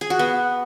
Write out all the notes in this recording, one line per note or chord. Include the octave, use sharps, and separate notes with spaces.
G#4
F#4
B3